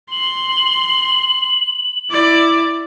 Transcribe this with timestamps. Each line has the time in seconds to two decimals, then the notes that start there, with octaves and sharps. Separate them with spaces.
0.12 C6 F#7
2.11 E4 D5